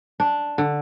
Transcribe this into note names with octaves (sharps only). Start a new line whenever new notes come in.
D4
D3